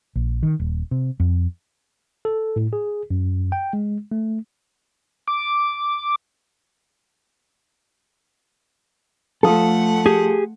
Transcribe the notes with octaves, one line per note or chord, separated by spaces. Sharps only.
A#1
D#3
D#1
C3
F2
A4
A2
G#4
F#2
G5
G#3
A3
D6
F3 A3 A4 F5 F#5 D#6
G4 G#4